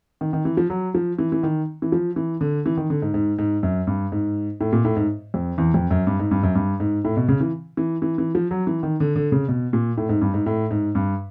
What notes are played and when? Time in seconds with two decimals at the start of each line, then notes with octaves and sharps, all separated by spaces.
0.21 D#3
0.33 D#3
0.45 E3
0.57 F3
0.70 F#3
0.95 F3
1.19 E3
1.32 E3
1.43 D#3
1.82 E3
1.92 F3
2.16 E3
2.41 D3
2.66 E3
2.77 D#3
2.90 D3
3.02 G#2
3.14 G#2
3.38 G#2
3.63 F#2
3.87 G2
4.12 G#2
4.60 A2
4.73 A#2
4.85 A2
4.96 G#2
5.34 F2
5.58 E2
5.74 F2
5.91 F#2
6.07 G2
6.19 G#2
6.31 G2
6.43 F#2
6.55 G2
6.80 G#2
7.04 A2
7.17 B2
7.29 C#3
7.41 E3
7.77 E3
8.02 E3
8.18 E3
8.35 F3
8.51 F#3
8.67 E3
8.83 D#3
9.00 D3
9.16 D3
9.32 C#3
9.48 B2
9.73 A#2
9.97 A2
10.09 G#2
10.21 G2
10.34 G#2
10.46 A2
10.71 G#2
10.95 G2